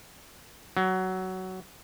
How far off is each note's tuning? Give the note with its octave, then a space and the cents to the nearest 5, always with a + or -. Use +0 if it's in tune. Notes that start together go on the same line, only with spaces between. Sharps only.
F#3 +15